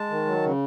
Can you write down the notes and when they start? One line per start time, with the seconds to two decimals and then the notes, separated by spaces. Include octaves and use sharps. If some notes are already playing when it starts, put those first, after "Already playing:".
Already playing: G#3 A5
0.10 D#3
0.26 F#3
0.42 C#3